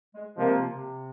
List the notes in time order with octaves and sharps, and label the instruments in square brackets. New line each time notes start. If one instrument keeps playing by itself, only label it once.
[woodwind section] G#3
[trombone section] C3 F3 A#3 [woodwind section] G#3
[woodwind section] C3